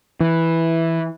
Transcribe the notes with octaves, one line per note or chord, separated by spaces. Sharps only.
E3